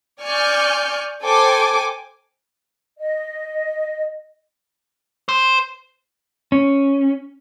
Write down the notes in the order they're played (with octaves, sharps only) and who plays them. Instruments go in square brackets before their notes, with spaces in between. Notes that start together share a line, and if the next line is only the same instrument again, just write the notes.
[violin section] D5 G#5 C#6 F6 G6
A4 C5 G5 G#5 D6
[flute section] D#5
[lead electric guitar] C5
[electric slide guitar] C#4